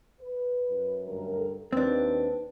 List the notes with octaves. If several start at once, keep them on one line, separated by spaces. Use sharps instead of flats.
B4
F#2
D2 G2 A#4
A4
D#2 C4 D4 B4